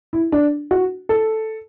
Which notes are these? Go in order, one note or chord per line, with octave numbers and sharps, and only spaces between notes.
E4
D4
F#4
A4